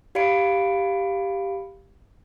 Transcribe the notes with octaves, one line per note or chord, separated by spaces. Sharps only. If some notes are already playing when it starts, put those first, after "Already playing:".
G4 D5 F5 B5 C#7 D7